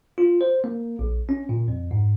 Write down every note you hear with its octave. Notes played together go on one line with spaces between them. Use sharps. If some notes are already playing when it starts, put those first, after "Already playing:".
F4
C5
A#3
A#1
C#4
A#2
F2
G#2